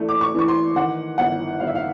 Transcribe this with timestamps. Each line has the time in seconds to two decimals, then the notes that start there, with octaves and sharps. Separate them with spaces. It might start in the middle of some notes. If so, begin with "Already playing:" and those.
Already playing: E3 A3 D4
0.09 D6
0.21 C#6
0.34 E3 C#6
0.48 C6
0.76 D#3 F#5
1.18 G1 F#5
1.60 G1 F5
1.67 E5
1.75 F5